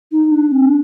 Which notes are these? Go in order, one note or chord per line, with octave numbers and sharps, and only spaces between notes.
D#4
D4
C4
D4